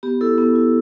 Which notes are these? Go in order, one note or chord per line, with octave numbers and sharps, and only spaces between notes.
B3 G4
E4 A4
B3
E4